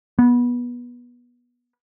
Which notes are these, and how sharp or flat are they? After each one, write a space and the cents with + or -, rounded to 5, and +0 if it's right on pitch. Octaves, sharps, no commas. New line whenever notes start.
B3 -20